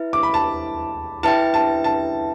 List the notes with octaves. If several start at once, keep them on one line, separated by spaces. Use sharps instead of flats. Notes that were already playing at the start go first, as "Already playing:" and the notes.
Already playing: E4 B4 E5
D6
B5
A5
E4 B4 E5 G5 A5
A5
A5